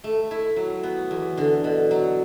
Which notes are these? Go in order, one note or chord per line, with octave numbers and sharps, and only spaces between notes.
A3
E4
F#3
B3
E2
D3
B2
F#3